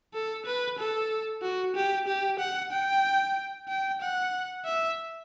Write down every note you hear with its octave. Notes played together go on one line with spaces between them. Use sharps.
A4
B4
A4
F#4
G4
G4
F#5
G5
G5
F#5
E5